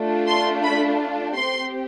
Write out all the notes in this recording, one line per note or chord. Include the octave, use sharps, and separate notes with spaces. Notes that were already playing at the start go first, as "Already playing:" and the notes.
Already playing: A3 D4 F4
C6
B5
C4 G4 C6